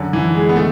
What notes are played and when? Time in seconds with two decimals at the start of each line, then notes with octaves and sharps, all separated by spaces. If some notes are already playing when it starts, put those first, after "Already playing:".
Already playing: F#2 D3
0.13 E3
0.35 G#3
0.49 B3
0.56 D3 A3